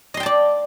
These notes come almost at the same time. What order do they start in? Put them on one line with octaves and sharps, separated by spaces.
D#5 C6 G5 A5 D5